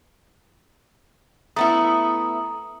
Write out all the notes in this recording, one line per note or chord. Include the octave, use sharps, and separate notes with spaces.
A3 B3 E4 A#5 D#6